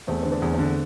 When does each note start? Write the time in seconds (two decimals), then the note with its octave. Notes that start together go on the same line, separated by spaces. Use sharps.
0.07 E2 A3 C4
0.23 D3 C4
0.31 B3 D4
0.42 E2
0.53 A3 C4
0.59 D3